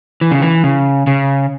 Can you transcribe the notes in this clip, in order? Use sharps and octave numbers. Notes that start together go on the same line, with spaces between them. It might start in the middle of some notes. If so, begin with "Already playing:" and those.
E3
C#3
E3
C#3
C#3